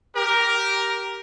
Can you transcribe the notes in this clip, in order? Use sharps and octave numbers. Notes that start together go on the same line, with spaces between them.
G4 A#4